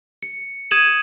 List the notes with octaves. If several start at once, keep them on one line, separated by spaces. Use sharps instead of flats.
C#7
D#6 G#6 D#7 E7 F#7